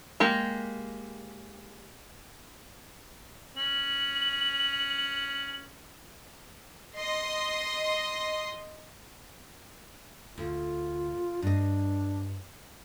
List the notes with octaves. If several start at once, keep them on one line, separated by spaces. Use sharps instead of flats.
G#3 A#3 G4
C#4 F#7
D#5 C6
D2 F4
G2 D4 D#5